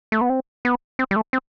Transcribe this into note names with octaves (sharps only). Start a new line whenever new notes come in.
A3
B3
C4
B3
C4
G3
A3
C4